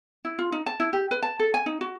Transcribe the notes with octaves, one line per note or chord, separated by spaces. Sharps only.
E4
F4
D#4
A5
E4
G4
B4
A5
A4
G#5
D#4
F#4